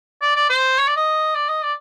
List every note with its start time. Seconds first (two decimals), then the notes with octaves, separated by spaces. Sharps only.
0.22 D5
0.36 D5
0.49 C5
0.78 C#5
0.87 D5
0.97 D#5
1.35 D5
1.49 D#5
1.63 D5